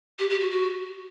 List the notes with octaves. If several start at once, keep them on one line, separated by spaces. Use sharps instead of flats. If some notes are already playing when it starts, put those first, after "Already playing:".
G4
G4
F#4
F#4